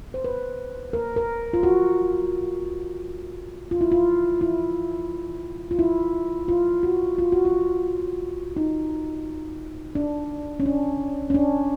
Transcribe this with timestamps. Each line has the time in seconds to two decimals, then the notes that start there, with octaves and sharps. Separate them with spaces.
0.14 C5
0.24 B4
0.93 A#4
1.16 A#4
1.53 F4
1.63 F#4
3.71 F4
3.81 E4
3.92 F4
4.41 E4
5.71 F4
5.79 E4
6.48 F4
6.83 F#4
7.18 F4
7.32 F#4
7.45 F4
8.57 D#4
9.95 D4
10.60 C#4
10.66 D4
11.30 C#4
11.34 D4